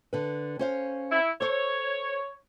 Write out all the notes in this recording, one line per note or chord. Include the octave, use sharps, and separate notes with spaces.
D3 B4
C#4 C5 F5
E4
A4 C5 C#5